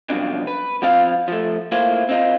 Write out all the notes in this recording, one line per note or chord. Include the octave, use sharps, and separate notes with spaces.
C2 F#2 B2 F3 C4 D4
B4
F3 B3 C4 F4 F5
F3 A3
A2 A#3 E4 F4 C5
C4 D#4 F4